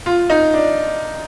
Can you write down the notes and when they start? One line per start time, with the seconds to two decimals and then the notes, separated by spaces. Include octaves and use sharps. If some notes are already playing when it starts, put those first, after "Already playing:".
0.06 F4
0.30 D#4
0.54 D4